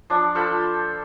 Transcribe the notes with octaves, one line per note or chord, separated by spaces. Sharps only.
F3 D4
F4 A4 C5 B5